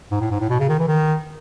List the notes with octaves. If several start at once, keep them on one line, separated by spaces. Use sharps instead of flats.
G#2
A2
G#2
A2
B2
C#3
D#3
E3
D#3